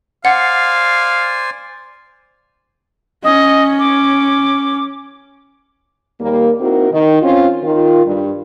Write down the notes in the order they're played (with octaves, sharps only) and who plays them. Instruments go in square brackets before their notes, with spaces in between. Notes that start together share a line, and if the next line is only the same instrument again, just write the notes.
[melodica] C5 D5 G#5 [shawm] F5 [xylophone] F#5
[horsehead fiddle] C#4 [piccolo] D#5
[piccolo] D6
[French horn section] D#2 G3 A#3
C4 D#4 E4 F#4 A#4
D#3
C4 C#4 F4
D#3 F4
G2